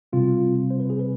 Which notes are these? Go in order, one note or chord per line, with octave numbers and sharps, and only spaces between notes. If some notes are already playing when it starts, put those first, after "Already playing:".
C3 G3 C4 F4
C5
B4
G#4
B4